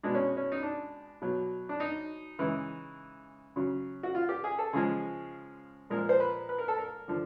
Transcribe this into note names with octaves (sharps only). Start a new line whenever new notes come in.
B2 G#3 D4
C#4
C#4
D#4
D4
B2 F#3
D4
D#4
C#3 E3 G#3
C#3 F#3
F#4
F4
G4
G#4
A4
C#3 F3 G#3 G#4
A#2 F3 G#3 A#4
C5
B4
B4
A#4
A4
A#4
D3 F3